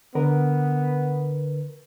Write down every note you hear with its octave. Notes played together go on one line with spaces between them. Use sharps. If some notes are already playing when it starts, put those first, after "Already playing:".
D3 B3 A#4 B4